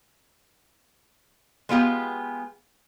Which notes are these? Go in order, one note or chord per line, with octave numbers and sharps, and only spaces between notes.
G#3 B3 F4 G4